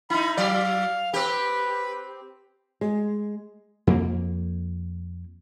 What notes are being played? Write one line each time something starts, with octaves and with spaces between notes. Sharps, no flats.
D#4 E4 B5
F#3 D5 F5
C4 G4 B4
G#3
F2 A#3